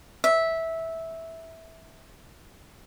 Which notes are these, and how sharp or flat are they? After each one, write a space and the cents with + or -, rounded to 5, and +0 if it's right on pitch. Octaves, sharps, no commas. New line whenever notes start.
E5 -15